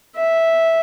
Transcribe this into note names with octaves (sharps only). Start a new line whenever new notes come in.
E5